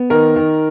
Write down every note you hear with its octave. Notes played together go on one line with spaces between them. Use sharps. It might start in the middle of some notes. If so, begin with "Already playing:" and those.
Already playing: B3
D#3 A#4
D#3